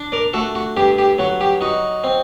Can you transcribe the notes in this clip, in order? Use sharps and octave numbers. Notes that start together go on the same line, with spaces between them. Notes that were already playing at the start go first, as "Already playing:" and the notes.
Already playing: D4
A#4 D5
A3 F#4 A4
F#4
G2 G4
G4
F#3 F#4
G4
D#4 F#4
C4